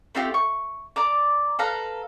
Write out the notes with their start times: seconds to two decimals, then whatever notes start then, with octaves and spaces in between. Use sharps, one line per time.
0.15 A3 C4 F4 G4
0.34 C#6
0.96 D5 A#5 D6
1.59 A4 B4 F5 A#5